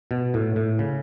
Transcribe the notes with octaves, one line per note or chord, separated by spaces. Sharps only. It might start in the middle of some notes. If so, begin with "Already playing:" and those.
B2
A2
A2
C#3